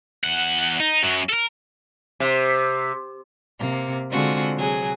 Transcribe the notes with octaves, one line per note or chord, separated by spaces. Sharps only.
E2 F#5
D#4
F#2 F#3
A4 A#4
C3
C3 A#3
D3 G#3 C4 F4 F#4 G#4
C3 F#3 G#4 G#5